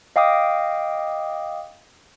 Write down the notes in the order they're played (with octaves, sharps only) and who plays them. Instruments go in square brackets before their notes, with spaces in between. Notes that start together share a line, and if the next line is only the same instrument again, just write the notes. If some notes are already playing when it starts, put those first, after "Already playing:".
[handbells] D#5 F5 G5 D6 D#6